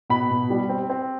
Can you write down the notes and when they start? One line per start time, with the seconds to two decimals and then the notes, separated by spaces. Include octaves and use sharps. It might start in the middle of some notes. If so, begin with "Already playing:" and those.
0.10 B2 B5
0.31 B2
0.50 G3
0.69 C4
0.90 C4